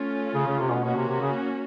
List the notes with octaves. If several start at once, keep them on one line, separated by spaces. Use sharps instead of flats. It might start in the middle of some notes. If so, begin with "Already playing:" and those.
Already playing: A3 C#4 F4
C#3
C#3
C3
B2
B2 A#3 C#4 F#4
C3
C3
C#3